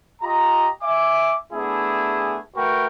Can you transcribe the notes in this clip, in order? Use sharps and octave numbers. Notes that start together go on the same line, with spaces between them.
F4 G4 D#5 A#5
E5 G#5 D6
A3 B3 D4 E4 G#4
A3 F#4 A#4 B4 G5 C#6